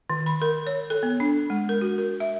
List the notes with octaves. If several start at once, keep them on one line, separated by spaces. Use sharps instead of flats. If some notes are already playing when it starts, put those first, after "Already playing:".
D#3
B5
A#4
C#5
A4
B3
D4
G#3
A#4
F#4
A#4
E5